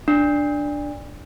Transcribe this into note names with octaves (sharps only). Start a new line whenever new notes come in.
D4